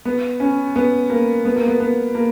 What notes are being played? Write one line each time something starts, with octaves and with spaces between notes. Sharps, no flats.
B3
C#4
B3
A#3
B3
A#3
B3
B3
A#3